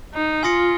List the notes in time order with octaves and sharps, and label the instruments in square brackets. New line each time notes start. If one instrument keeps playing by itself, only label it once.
[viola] D#4
[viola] F4 [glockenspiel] G#5 C6 D#6 A#6 C#7